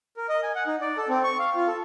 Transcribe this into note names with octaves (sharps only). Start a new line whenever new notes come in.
A#4
D#5
G#5
F#5
D#4
D5
A4
C4
C#6
F5
F4
A4